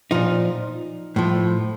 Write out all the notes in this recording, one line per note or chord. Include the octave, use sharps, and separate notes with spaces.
A#2 F3 D#4
A2 F3